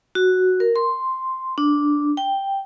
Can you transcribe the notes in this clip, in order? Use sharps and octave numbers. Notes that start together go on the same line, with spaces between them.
F#4
A#4
C6
D4
G5